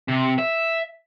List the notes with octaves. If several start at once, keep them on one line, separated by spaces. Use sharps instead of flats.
C3
E5